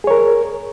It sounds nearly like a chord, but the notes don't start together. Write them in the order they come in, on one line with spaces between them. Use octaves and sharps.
G#4 C#5 A#4